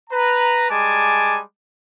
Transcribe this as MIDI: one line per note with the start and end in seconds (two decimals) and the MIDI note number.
0.10 0.67 71
0.10 0.67 82
0.70 1.39 55
0.70 1.39 56
0.70 1.39 80
0.70 1.39 81
0.70 1.39 86